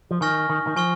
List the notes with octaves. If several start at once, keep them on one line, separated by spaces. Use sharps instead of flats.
F3
D#3 G#5 C#6 F6 A#6
D#3
D#3
F3 G#5 C#6 F6